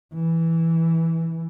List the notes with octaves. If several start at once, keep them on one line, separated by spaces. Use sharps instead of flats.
E3